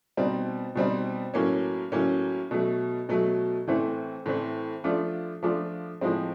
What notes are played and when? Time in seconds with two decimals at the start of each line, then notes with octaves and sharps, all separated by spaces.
0.17 B2 G3 C4 D#4
0.75 B2 G3 C4 D#4
1.34 A2 F#3 A#3 C#4
1.92 A2 F#3 A#3 C#4
2.51 B2 F#3 A3
3.09 B2 F#3 A3
3.68 A2 E3 A3 C4
4.26 A2 E3 A3 C4
4.84 F3 A3 D4 F4
5.43 F3 A3 D4 F4
6.01 A2 F3 G#3 C4